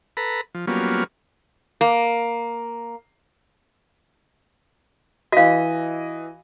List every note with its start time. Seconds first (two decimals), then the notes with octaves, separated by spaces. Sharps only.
0.17 A4 B4 A#5 B5
0.55 F3
0.67 F#3 G3 A#3 B3 C#4 F4
1.81 A#3
5.32 E3 F#4 D#5 F5